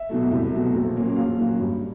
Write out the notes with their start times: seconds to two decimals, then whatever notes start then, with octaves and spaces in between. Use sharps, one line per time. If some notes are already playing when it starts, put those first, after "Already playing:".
Already playing: E5
0.09 B2 F#3 A3
0.31 C2
0.53 B2 F#3 A3
0.74 A#1
0.96 A#2 F#3 A#3 C#4
1.16 A#1 F5
1.38 A#2 F#3 A#3 C#4
1.59 G2